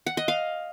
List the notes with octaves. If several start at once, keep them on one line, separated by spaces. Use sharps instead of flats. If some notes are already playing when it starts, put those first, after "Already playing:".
F#5
D#5
F5